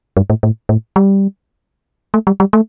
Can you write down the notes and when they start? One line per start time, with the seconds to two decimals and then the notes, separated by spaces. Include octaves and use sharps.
0.17 G2
0.30 A2
0.43 A2
0.69 A2
0.96 G3
2.14 A3
2.27 G3
2.40 G3
2.53 A3